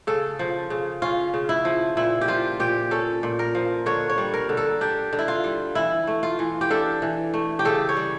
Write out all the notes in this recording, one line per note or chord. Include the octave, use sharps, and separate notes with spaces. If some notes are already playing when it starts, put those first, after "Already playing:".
C#3 A4
F3
C#3
C#4 F4
C#3
E4
F3
A#2 E4
G4
F3 F4
A#2 G4
C#4 A4
A#2
A#4
F3
D3 C#5
C#5
G3
A#4
D3
A4
D4 G4
D3
E4
F4
G3
E3 E4
A3
F4
E3
G4
D4 A4
E3
A3
G4
C#3 A4
C#5
G3